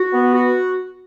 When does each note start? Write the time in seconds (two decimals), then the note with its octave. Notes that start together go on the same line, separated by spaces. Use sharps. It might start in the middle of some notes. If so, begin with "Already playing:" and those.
Already playing: F#4
0.13 B3
0.33 F#4